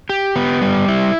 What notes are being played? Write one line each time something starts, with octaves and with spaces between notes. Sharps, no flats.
G4
B3
G3
E4